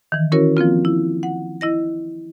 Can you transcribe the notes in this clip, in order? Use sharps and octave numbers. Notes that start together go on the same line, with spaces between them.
D#3 E3
C#4 E4 F#4 A#4 C#5
F3 A#3 C4 F4
E4
F#5
E4 D#5 A#6